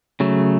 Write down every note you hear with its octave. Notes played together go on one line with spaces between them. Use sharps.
C#3 F#3 A3